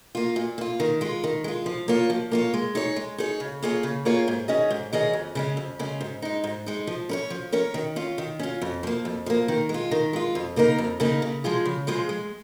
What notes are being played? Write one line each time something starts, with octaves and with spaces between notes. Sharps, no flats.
A#3 F4
A#2
A#3 F4
D#3
G#3 F4
D#3
G#3 F4
F3
A#3 F4 C#5
F3
A#3 F4 C#5
G#3
D#4 G#4 C#5
G#3
D#4 G#4 C#5
C#3
A#3 F4 G#4 C#5
C#3
A#3 F4 G#4 C#5
G#2
D#3 C#4 G#4 D#5
G#2
D#3 C#4 G#4 D#5
F2
C#3 G#3 C#4
F2
C#3 G#3 C#4
G#2
G#3 D#4
G#2
G#3 D#4
F3
C#4 A#4 C#5
F3
C#4 A#4 C#5
D#3
C#4 F4
D#3
C#4 F4
F2
F3 A#3
F2
F3 A#3
D#3
G#3
F4
D#3
G#3 F4
F2
C#3 A#3 D#4 A#4
F2
C#3 A#3 D#4 A#4
C#3
F3 G#3 F4 G#4
C#3
F3 G#3 F4 G#4
G#3